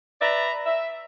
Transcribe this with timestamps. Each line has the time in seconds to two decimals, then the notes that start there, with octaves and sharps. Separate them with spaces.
0.21 B4 D5 E5 A#5
0.65 E5